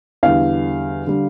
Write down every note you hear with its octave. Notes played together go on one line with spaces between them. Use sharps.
E2 D3 G3 F5
D3 G3